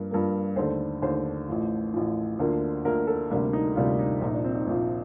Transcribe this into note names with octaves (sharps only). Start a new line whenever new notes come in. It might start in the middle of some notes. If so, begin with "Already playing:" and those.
Already playing: G2 F3 A#3
G2 F3 A#3
D#2 D3 A3 C5
D#2 D3 A3 C5
A1 A2 F3
A1 A2 F3
D2 D3 F3 A#3
D2 D3 F3 A#3 A#4
A4
D2 C3 G3 A#3 D4
D#4
D2 C3 G3 A#3 F4
D#4
A#1 A#2 F3 D#4
D4
C4
D#4
A#1 A#2 F3